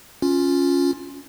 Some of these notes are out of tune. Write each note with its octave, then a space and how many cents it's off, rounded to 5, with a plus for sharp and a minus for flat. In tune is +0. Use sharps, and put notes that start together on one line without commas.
C#4 +5 F4 +10